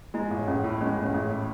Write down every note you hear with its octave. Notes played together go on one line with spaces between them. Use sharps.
G#3 E4
A1
A1 C#4
A2
G#3 C#4
A1
C#4
A1 C#4
A2